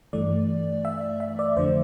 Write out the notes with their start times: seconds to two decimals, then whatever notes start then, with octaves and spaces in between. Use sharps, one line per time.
0.13 G2 E3 A3 D5
0.85 E5
1.20 E5
1.39 D5
1.57 F2 D3 F3 A3 C5